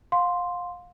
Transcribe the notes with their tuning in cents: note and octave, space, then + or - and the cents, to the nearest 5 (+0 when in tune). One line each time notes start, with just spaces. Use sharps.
F5 +30 C6 +0